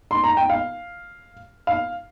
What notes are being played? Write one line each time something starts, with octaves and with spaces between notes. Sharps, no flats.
C6
A#5
G5
F5
F5